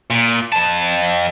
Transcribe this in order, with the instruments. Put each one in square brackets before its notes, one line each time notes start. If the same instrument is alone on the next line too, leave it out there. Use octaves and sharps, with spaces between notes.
[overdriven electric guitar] A#2
F2 A5